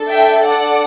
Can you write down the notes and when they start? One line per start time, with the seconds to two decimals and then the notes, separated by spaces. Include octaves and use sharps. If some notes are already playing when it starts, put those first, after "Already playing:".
Already playing: D4 A4
0.08 E5 G5
0.44 D5 F#5